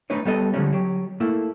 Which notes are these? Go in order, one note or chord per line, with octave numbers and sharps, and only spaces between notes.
A3 D4 D#4 B4 C#5
G3 B3 A4 D#5
D3 F3 G3 G#3 C#4 D#4
F#3 G4
A3 A#3 E4 A4